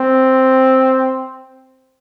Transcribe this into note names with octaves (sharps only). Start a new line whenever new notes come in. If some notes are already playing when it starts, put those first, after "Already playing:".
Already playing: C4